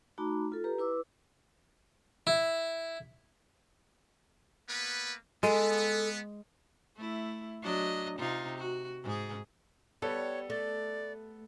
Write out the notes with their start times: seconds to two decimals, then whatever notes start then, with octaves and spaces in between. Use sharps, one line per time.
0.18 A3 D#4 F#4 A#5 B5 D6
0.52 F4 A4
0.64 G4 B4 A#5
0.78 E4 B4 D6 E6
2.27 E4
4.68 A#3 B3 B4
5.43 G#3 B3 A4
6.97 A3 E4
7.62 F#3 D4 D#5
8.19 C3 D#4 F4
8.58 F#4
9.03 G#2 G#4
10.02 G3 B3 A4 C#5
10.50 A3 D5